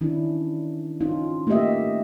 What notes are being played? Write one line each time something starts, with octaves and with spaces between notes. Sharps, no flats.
D#3 C#4 D4 E4
C#4 D#4 F4
A3 A#3 F4 G4 D#5 E5